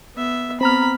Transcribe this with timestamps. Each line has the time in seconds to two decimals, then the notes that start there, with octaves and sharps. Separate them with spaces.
0.16 B3 E5
0.61 B3 C4 A#5 B5 F6